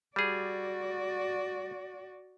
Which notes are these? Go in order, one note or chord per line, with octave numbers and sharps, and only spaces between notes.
G3 F#4 G#4 D5